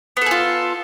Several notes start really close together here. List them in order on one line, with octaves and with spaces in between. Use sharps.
B3 A4 G#4 F4